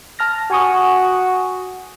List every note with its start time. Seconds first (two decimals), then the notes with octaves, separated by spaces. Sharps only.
0.19 A5 F6 A#6
0.51 F#4 G#5 C#6 D#6